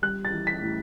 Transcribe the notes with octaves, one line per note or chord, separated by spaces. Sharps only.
G3 F#6
A6
E3
B6
A2